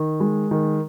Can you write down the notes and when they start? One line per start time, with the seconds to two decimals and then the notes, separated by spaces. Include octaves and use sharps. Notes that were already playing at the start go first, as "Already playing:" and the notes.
Already playing: D#3
0.20 G#3
0.51 D#3